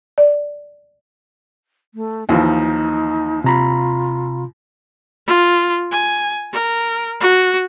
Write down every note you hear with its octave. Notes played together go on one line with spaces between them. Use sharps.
D5
A3
D#2 E3 F3 D#4
C3 F4 A#5 B5
F4
G#5
A#4
F#4